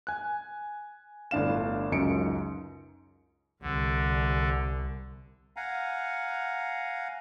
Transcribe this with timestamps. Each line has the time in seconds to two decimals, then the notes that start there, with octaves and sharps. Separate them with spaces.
0.07 G#5 F#6
1.31 G1 A2 D4 F5 E7
1.92 C#2 F#2 D#4 C#7 D7
3.62 C2 D3
5.57 F5 F#5 G#5 A#5